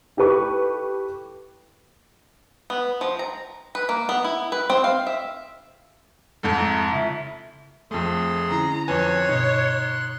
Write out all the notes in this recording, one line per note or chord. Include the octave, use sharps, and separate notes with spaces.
E4 G4 A4 B4 C#6 D6
B3
F3
A#5
B4
A#3
B3
E4
B4
C4
F5
E5
F2 G#2 G#3 A4
E4 A#5
C#3 E4 F4
F2 A3 G#4 C6
D3 C#4 E4 A#5
F2 B4 C#5 G#5 C6 D6 F#6
G2 B2 D#4